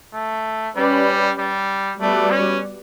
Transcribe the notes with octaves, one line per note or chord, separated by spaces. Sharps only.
A3
G3 C#4 G4 B4 D5
G3
G3 A3 B3 F#4 B4 D5
C#4